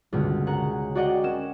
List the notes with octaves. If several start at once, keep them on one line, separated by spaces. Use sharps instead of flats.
C#2 G2 B2 D3
G#4 A#4 C#5 F#5 G#5 A#5
F#4 G#4 D5 D#5 F#5 G5
C#4 A#4 E7